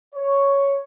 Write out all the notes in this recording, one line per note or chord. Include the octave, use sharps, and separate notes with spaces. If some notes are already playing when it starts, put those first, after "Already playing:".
C#5